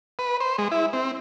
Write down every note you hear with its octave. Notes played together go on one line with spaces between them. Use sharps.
B4
C5
G#3
E4
C4